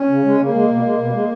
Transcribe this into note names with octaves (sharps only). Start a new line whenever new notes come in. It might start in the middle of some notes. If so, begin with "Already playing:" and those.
Already playing: C#4
C#3
G#3
C#3 A#3
G#3
B2
G#3
B2
G#3